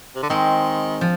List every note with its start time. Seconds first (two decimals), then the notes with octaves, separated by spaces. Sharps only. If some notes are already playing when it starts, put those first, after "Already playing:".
0.16 C3
0.23 D3
0.30 D#3 G#3 C4
1.01 F3